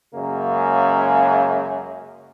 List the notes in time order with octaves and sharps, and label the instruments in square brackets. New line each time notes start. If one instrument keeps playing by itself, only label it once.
[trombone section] F#2 C#3 G#3 A#3